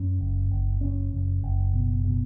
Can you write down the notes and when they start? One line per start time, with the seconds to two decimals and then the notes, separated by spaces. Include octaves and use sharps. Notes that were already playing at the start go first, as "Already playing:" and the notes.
Already playing: F#2 C#4
0.19 F#1
0.51 F#1
0.81 F#1 C#4
1.12 F#1
1.43 F#1
1.74 B2
2.05 B2